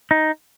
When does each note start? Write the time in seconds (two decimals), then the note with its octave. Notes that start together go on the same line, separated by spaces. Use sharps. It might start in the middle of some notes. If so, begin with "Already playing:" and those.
0.11 D#4